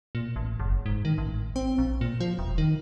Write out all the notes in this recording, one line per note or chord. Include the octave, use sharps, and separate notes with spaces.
A#2
A1
F#1
G#2
D#3
A1
C4
A#1
A#2
F3
E1
D#3